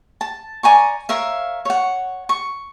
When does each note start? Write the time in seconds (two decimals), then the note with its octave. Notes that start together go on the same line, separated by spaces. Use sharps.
0.21 A5
0.63 D5 G#5 A#5 C#6
1.09 A#4 C#5 E5 F5
1.65 C#5 F#5
2.29 C#6